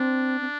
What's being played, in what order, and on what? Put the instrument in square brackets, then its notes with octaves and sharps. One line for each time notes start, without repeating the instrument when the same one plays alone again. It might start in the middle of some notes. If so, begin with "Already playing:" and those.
Already playing: [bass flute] C4 [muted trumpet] D4
[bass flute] C4